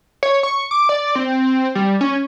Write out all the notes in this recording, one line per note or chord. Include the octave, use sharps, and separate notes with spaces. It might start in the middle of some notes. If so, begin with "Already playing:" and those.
C#5
C#6
D6
D5
C4
G3
C#4